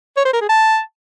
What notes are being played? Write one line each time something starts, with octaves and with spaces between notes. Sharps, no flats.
C#5
C5
A#4
G#4
A5